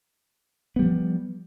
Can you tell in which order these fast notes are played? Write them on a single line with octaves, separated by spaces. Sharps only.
B3 G3 F3